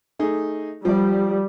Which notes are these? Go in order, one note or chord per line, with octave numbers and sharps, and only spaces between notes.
A3 D#4 G#4
F3 G3 D5